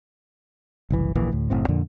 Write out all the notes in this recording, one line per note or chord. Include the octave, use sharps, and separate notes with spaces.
F#1 C2 E3
D1 A#1 E3 A#3
D2 A2
F#1 A2 C4
F2 A#2 D3